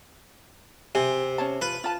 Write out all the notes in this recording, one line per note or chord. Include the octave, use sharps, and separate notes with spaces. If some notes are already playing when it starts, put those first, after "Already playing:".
C3 G#5
C#4 C#5 A5
F4 B4
F4 A5